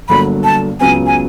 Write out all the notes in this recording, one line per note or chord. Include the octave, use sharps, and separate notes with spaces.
G1 G2 D3 F#3 A#3 B5
A5
C#2 C#3 F#3 B3 G#5
G#5